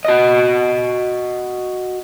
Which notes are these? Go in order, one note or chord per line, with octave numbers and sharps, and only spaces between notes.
F#4 D#5